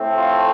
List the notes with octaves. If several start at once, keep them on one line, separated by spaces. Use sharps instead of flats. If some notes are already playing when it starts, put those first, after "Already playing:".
Already playing: A2 A3 C4
F4